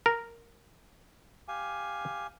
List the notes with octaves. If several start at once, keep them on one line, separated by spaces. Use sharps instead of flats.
A#4
G4 F5 G#5